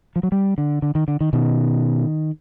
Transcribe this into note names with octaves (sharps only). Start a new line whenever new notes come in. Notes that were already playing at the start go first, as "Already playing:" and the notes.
F3
F#3
G3
D3
D3
D#3
D3
D#3
B2 D#3